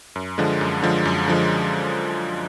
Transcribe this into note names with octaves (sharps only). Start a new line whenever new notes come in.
F#2
D3 F3 G#3
F#2
D3 F3 G#3
F#2
D3 F3 G#3